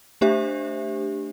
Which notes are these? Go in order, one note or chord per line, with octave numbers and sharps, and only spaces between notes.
A3 D4 G4 C5 E5